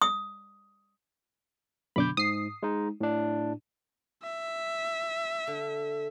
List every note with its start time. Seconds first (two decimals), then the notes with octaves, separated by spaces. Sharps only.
0.02 D#6
1.96 F#2 B2 D3 B5 D6 G6
2.17 G#2 D#6 C7
2.63 G#3 D#4
3.00 A2 D4
4.23 E5
5.47 D3